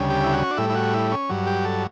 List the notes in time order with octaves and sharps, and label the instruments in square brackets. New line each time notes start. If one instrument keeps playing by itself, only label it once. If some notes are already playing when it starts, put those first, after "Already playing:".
Already playing: [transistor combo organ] D2 C#3 G3
G4
E4
F#4
C#4
D4
A2 G3 E4
E4
F#4
E4
C#4
G2 F#3
G4
A4